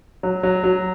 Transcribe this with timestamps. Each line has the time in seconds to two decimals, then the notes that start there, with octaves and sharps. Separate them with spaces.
0.23 F#3
0.43 F#3
0.64 F#3